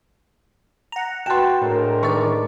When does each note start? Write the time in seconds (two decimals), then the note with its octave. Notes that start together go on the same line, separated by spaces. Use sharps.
0.92 F#5 A#5
1.26 F#4 B4 G5 A5 C6
1.62 A2 G#3 D4 A#4
2.03 D#3 E3 D5 C#6